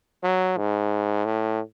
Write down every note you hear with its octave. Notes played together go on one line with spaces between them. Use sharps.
F#3
G#2
A2